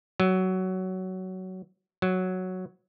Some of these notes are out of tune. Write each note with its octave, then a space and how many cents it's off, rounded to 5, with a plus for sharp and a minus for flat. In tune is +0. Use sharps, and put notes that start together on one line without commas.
F#3 +15
F#3 +0